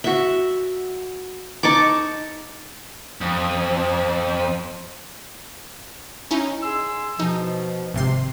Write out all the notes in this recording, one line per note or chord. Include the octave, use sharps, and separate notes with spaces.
F#4 E5
D#4 A5 C#6 D6
F2
C#4 D#4 E4
G#4 C6 E6
B2 F3 D#4
G#1 C3 C6